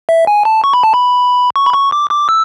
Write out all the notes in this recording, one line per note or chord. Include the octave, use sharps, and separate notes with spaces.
E5
G#5
A5
C#6
B5
A5
B5
C#6
B5
C#6
D6
D6
E6